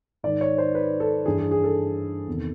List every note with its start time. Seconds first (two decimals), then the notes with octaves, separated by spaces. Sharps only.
0.23 G#2 D#3 D5
0.41 C#5
0.58 C5
0.75 B4
1.00 A4
1.25 G2 E3 G#4
1.38 G#4
1.51 G#4
1.64 A4
2.27 E2 C3 D#3